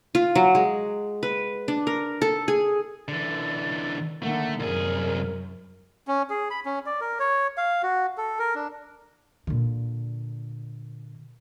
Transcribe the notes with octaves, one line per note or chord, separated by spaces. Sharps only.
F4
F#3
G#3
B4
D4
A#4
A4
G#4
D3 E3 A6
D3 D#3 A3 A#3 F#5
C2 F#2 G#4 A#4
C#4
G#4
B5
C#4
D5
A#4
C#5
F5
F#4
A4
A#4
D4
A#2 D3